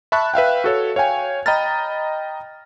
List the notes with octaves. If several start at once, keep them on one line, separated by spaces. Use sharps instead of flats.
E5 A5 B5 C#6 F#6
B4 E5 F5 G5
F#4 A4 C#5
C#5 F5 G5 G#5
D#5 G5 A#5 B5 F6 A6